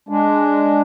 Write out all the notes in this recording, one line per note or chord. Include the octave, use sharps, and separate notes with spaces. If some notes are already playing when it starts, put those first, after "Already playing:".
G#3 D4